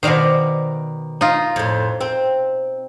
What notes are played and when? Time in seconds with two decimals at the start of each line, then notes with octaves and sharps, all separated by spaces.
0.03 B2 D#3 C5 D5 F5
1.21 D#4 F4
1.56 F2 A2
2.01 C4